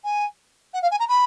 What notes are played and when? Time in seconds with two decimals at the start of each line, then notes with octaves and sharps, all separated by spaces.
0.04 G#5
0.74 F#5
0.82 F5
0.91 G#5
0.99 A#5
1.08 B5